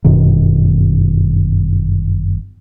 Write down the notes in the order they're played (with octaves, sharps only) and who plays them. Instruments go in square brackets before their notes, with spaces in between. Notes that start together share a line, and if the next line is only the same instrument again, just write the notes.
[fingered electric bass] G1 F#2 B2 D#3